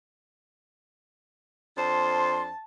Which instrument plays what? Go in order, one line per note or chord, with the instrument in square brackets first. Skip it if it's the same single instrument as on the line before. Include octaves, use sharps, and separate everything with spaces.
[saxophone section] F2 D4 C5 [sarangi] A5 [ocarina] C6